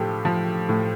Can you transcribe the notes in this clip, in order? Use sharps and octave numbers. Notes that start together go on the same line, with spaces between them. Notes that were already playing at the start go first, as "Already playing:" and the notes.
Already playing: A2 F3 G4 A4
F3
A2